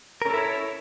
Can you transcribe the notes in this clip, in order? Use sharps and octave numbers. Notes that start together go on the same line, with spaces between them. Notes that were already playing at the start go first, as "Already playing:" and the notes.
C#4 E4 A4 A#4 C#5